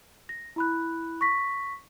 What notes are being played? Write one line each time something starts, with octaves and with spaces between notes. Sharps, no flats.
A#6
E4 B5 F#6
C#6 A#6 B6